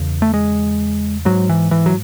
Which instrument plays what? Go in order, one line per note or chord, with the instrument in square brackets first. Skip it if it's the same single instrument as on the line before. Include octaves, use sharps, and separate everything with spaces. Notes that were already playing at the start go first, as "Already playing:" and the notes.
Already playing: [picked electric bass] E2 C#3
A3
G#3
G#2 F#3
E3
E3
F#3